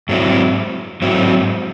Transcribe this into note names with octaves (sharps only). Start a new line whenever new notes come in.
G#2 F#3 C4 E4
G#2 F#3 C4 E4